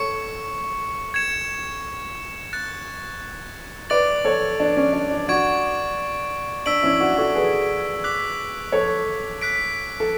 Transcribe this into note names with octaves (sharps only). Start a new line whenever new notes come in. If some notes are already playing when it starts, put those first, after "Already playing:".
Already playing: A4 C#5 C#6 C#7
G#6 C#7 E7
F#6 A6 C#7 E7
B4 D5 D6 A6 D7 F#7
A4 C#5
D4
C#4
D4
D4
D4 F#4 C#6 G#6 D7
D4 E6 B6 D7 F#7
C#4 E4
D4 F#4
F#4 A4
G#4 B4
D6 F#6 B6 F#7
A4 C#5
F#6 B6 D7
A4